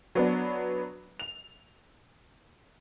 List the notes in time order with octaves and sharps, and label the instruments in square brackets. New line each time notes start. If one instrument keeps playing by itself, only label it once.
[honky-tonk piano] F#3 B3 D4
F7